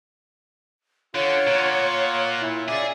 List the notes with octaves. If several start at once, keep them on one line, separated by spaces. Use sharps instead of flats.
D3 F4 C#5 F#5
A#2
E4
C#3 G#4 D5 E5